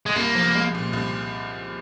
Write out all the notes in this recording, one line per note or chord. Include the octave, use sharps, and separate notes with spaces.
G#3
C2 A#3
F3
G#3
A#2
C2